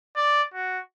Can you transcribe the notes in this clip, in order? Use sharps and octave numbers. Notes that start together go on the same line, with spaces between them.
D5
F#4